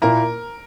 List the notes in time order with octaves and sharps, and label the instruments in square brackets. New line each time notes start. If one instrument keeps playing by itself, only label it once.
[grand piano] A#2 A#3 E4 [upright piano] A#4 A#5